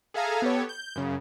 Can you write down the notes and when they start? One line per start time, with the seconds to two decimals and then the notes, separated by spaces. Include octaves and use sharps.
0.14 G#4 A4 E5 F5 G#5 A#5
0.42 B3 G4 A4 C#5
0.69 G6
0.96 F#2 C#3